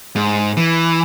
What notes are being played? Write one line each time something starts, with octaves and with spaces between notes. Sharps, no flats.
G#2
E3